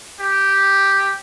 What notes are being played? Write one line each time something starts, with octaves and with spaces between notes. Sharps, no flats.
G4